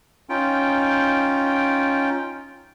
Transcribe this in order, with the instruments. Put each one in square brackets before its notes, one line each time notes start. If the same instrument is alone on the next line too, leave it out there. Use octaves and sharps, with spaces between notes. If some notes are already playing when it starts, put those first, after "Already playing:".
[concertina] C#4 D#4 F4 G5